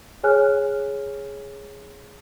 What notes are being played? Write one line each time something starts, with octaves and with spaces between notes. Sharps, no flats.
G#4 C#5 G#5 F6 F#6